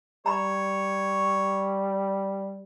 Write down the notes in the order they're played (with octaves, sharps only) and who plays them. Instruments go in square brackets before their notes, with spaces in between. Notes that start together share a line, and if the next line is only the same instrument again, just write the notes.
[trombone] G3 [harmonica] C#5 [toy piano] A#5 B5